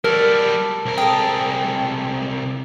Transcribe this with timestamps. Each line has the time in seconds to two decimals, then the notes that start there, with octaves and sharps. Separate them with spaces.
0.04 G3 F#4 A4 A#4
0.86 C2 A#4
0.98 G#4 A4 G5